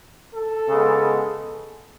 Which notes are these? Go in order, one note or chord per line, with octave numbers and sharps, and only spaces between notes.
A4
C#3 G#3 B3